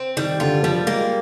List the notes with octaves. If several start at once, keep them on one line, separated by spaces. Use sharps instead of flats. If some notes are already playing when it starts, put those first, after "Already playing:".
Already playing: C4
D#3 G3
D3 F4
F3 G3
G#3 A#3